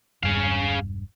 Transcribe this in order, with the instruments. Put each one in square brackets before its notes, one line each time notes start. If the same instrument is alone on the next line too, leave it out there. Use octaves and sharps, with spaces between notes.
[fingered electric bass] E1 B1 G2 [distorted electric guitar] G#4 F5